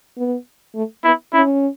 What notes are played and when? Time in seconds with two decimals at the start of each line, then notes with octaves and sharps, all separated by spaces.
0.18 B3
0.75 A3
1.04 B3 E4
1.33 C#4 E4